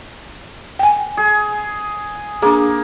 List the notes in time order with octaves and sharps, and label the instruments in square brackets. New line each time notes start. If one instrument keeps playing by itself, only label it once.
[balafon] G5 G#5
[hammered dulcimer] G#4
[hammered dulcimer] A#3 [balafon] D4 G#4